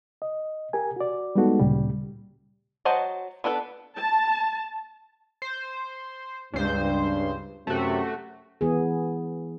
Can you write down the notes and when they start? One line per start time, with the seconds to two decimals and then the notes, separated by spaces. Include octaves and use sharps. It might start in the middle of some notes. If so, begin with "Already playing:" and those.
0.22 D#5
0.73 G4 A#4 G#5
0.96 F#4 D5
1.35 G3 G#3 B3 D#4 F#4 A4
1.60 D2 A#2 C#3 G3
2.85 F#3 C5 D#5 F#5 A5
3.44 B3 D4 A4 B4
3.96 A5
5.42 C5
6.53 C#2 G2 C5
7.67 F#2 C3 A3 F#4
8.61 E3 B3 G#4